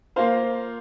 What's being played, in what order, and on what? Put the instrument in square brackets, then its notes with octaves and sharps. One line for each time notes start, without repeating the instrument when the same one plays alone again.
[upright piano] A#3 F4 C5 F5